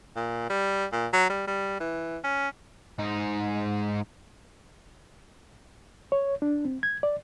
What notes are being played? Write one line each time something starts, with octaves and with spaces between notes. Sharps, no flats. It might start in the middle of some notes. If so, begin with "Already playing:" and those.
A#2
G3
A#2
F#3
G3
G3
E3
C#4
G#2 D#4
C#5
D4
C4
G#6
D5